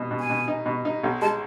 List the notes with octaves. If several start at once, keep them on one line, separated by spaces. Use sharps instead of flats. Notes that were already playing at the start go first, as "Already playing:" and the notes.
Already playing: B2
B2
G#5
B2
D#4
B2
D#4
B1
G#3 A5